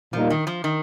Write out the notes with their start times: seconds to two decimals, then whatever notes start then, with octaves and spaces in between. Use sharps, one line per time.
0.13 A#2 F3 G3 A#3 D#4
0.30 D#3
0.47 F3
0.64 D#3